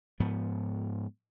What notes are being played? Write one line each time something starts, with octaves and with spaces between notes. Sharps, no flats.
G#2 F3 B3